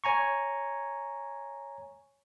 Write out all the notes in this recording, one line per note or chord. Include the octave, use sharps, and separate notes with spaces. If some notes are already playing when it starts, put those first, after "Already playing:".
C#5 G#5 A#5 C#6